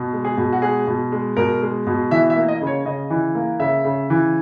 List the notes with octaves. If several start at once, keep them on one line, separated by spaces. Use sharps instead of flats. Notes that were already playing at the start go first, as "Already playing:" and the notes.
Already playing: B2
G#3
G#4
B2
F#4
G#3 G#4
B2
G#3
B2 A#4
G#3
B2
E3 E5
E5
A#3
D#5
C#3
C#5
C#3 D#5
E3
A#3
C#3 E5
C#3
E3